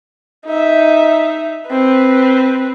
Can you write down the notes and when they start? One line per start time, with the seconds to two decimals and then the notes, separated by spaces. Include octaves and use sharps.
0.47 D#4 E5
1.69 C4 B4